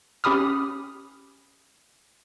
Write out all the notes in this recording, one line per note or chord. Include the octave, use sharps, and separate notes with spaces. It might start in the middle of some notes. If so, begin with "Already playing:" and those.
C#4 G4 B5 D#6 F6